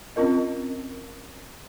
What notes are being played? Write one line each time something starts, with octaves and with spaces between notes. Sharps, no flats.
C4 C#4 F4 A#4 D#5